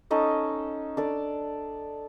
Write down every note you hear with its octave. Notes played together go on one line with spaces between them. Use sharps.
C#4 D#4 A4 D#5
D4 A4 D5